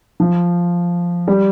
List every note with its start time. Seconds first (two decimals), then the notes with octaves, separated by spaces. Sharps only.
0.20 F3
1.28 G3